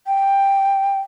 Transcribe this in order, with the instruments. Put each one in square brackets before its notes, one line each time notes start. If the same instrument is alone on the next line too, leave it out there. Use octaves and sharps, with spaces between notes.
[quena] G5